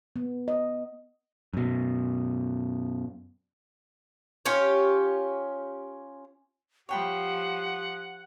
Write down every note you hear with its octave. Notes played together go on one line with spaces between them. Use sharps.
B3
D#5
F#2 B2
C#4 F4 G4 C#5
F3 G4 C#5 F#5 G5 B5